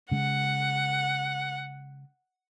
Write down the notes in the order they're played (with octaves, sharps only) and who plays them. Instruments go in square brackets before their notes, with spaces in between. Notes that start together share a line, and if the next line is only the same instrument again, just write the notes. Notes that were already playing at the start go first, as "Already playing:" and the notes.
[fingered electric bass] C#3 G#3 [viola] F#5